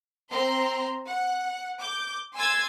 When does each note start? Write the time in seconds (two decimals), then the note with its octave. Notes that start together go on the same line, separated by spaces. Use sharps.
0.30 C4 A#5 C6
1.06 F#5
1.80 D6 G6
2.34 G#5 C6 E6 G#6 A6